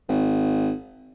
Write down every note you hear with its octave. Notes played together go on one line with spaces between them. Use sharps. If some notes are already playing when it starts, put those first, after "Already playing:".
G#1